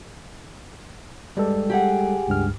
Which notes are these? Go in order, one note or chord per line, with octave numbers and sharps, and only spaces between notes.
G2 G3 G#3 A4
G4 G#4 F#5
C#2 G2 F6